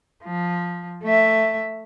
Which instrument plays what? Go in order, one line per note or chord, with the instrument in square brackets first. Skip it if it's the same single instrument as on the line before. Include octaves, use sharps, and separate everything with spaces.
[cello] F3
A3 E5